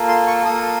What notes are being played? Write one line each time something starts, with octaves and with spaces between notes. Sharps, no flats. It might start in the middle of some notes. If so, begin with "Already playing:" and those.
Already playing: A#3 F4 A4
C6
C#6
A#3 F4 A4 D#6